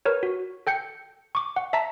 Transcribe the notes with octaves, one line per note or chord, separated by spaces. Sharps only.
A#4 B4 C#5
F#4
A4 G5 G6 C#7
C#6 D6
F#5
E5 A5 A#5 B6